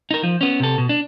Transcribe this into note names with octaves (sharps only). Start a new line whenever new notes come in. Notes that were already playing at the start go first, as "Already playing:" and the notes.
D#4 A#4
F3
B3 C#4
C3 A4
B2
D4